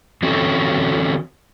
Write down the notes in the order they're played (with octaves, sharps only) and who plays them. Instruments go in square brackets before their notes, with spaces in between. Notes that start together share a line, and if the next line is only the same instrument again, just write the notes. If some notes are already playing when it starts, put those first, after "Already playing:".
[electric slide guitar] D3 E3 C4 C#4 F#4 A4